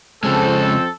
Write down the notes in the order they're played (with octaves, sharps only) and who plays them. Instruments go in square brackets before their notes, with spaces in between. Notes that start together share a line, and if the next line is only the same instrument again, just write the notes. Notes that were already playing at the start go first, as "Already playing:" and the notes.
[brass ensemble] F2 C4 A4 [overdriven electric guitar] C#3 G#3